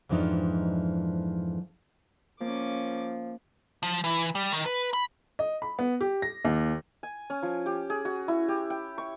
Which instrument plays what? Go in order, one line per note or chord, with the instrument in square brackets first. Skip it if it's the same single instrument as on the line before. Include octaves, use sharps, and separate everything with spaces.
[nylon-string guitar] F2 G#2 E3 F3 D4 D#4
[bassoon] F3 [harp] A#3 [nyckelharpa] C#4 D6
[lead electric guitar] F3
E3
G3
D#3
B4
B5
[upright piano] D#5
B5
B3
G4
A#6
D#2
[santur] G#5
C#4
F3
G4
G#4
F#4
E4
G4
G5
C#6